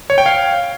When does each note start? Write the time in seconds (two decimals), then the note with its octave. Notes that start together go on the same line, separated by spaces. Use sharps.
0.10 C#5
0.18 G5
0.26 F5